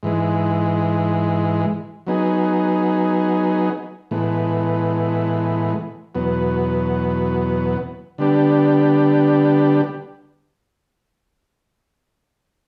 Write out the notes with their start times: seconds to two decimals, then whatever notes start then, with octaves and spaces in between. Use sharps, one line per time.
0.03 G#2 E3 G#3
2.07 F#3 B3 D#4 G#4
4.11 A2 E3 G#3 B3
6.15 E2 B2 F#3 B3
8.18 D3 G3 B3 D4 G4